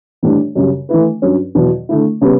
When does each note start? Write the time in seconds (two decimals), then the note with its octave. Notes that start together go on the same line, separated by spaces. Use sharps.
0.23 A2 E3 G3 D4 G4
0.55 F#2 C#3 G3
0.89 E3 A3 E4 B4
1.22 G2 F#3 C#4
1.55 E2 B2 F#3
1.89 D3 A3 E4
2.21 C#3 G3 B3